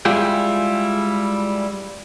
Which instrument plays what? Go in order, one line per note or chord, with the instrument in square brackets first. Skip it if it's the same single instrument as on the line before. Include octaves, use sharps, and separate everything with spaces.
[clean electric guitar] G3 G#3 E4 F4 G#4 G5